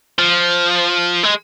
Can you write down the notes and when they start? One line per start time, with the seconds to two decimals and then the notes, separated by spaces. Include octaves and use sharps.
0.19 F3
1.24 G#3